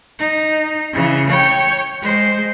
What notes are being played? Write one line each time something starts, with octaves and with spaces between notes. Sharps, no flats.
D#4
C#3 E3
C#5 G5
G#3 C5